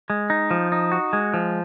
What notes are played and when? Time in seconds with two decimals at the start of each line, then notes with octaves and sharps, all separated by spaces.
0.10 G#3
0.30 D#4
0.51 F3
0.72 D#4
0.92 F#4
1.13 G#3
1.34 F3